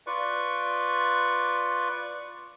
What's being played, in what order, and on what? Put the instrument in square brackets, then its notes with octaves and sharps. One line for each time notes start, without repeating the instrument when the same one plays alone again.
[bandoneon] F4 B4 D5 C#6